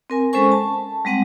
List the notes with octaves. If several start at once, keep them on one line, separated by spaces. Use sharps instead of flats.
C4 A#4 G#5
G#3 C#4 A4 C5 G#5 C#6
A5
G3 G#3 C4 F#5